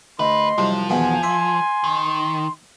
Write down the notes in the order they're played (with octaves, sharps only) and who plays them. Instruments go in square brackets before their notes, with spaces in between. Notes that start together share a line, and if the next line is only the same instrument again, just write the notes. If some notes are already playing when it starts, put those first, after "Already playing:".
[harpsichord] D2 [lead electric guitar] B4 [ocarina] D#5 [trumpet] C6
[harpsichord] C2 F#3 [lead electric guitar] F3
[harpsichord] E2 B2 D#3 [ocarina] F#5 [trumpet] G#5
[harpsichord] E5 [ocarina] C6
[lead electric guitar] D#3